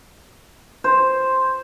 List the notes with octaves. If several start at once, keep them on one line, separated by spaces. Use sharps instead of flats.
C5